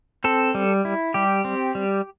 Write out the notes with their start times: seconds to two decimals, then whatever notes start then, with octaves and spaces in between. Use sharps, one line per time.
0.24 C4 A4
0.55 G3
0.85 E4
1.14 G3 G4
1.45 C4
1.75 G3